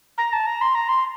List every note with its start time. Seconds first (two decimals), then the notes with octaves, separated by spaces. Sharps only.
0.18 A#5
0.33 A5
0.47 A#5
0.61 C6
0.75 A#5
0.89 C6